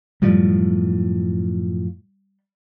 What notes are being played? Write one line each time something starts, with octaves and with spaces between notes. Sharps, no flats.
F#2 A2 F3 G3